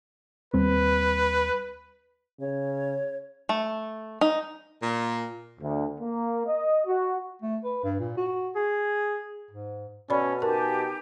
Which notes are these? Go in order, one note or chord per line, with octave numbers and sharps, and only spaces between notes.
D#2 G3 C4 B4
C#3 C#5
A3
D#4
A#2
D2
A#3
D#5
F#4
A3
B4
G2
A#2
F#4
G#4
G#2
B2 C#4 A4 D5 B5
D#4 G4 A#4 G#5 A5